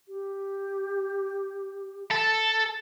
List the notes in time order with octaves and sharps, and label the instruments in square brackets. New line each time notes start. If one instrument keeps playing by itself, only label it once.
[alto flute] G4
[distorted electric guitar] A4